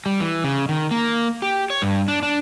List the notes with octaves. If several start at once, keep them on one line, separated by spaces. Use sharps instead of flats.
G3
E3
C#3
D#3
A#3
G4
C#5
G2
D4
D4